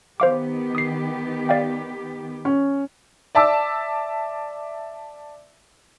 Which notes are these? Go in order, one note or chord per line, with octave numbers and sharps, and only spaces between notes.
D#3 B3 G4 C5 F5 D6
D#6 C7
D5 F5 G5
C#4
D5 E5 A5 D6 E6